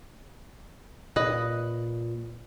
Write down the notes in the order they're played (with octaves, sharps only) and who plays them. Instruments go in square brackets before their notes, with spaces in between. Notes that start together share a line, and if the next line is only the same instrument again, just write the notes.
[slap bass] A#2 [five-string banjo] B4 D#5